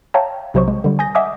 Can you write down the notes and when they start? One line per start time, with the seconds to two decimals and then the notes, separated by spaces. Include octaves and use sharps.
0.14 C#5 E5 F5 G5 A5 A#5
0.54 B1 C3 F#3 C5 D#5 C#6
0.68 G#3
0.84 D3 G3
0.99 G#5 D#6 G6 A#6
1.15 D#5 E5 F#5 G#5 D6 D#6